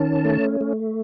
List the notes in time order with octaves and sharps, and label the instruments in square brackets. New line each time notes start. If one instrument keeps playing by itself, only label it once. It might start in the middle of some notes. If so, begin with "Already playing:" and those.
Already playing: [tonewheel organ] D#3 C#4 A5
A3
A3